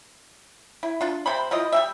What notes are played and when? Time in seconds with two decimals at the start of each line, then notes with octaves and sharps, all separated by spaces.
0.83 E4
1.01 D4 F4
1.26 C3 C5 B5
1.51 F3 E4 F4 D#5
1.72 G3 C4 E5